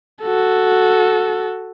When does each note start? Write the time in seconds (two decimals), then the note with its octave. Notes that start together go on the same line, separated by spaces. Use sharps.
0.22 F#4 A4